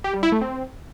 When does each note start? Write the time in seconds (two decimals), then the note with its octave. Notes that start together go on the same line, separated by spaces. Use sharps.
0.04 G4
0.14 G3
0.23 E4
0.32 A3
0.41 C4